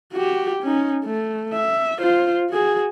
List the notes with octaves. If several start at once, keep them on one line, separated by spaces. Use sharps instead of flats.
F#4 G4
C#4 D#4
A3
E5
F4 C5
F#4 G#4